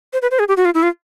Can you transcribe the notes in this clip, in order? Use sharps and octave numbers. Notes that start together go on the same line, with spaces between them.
C5
B4
C5
G#4
G4
F#4
F4
E4
F4